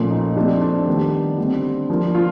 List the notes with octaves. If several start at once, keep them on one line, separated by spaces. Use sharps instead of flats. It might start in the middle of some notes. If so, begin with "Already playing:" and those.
Already playing: A#2 F3 A3 C#4
D#4
F3 A3 C4 D4
D4
D#3 G3 B3
D3 G3 C4
F3 A#3 D4
F4